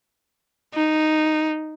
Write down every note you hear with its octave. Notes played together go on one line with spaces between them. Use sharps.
D#4